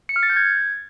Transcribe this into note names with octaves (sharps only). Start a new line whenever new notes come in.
C#7
F6
A6
G6
G#6